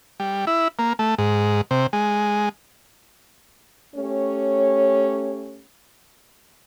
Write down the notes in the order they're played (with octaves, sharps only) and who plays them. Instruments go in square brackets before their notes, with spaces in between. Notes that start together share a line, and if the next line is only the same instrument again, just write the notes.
[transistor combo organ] G3
E4
A#3
A3
G#2
C3
G#3
[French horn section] A3 C#4 G4 C#5